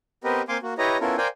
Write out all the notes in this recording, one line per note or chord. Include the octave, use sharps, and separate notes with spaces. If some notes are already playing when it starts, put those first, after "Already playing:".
B3 C4 G4 A#4 B4 D#5
A#3 C4 F5 G#5 C6 D6
A#3 F#4
E4 G4 B4 C#5 D#5 A#5
B3 C#4 E4 F4 A4 A#4
A#4 C5 D5 F5 G5 G#5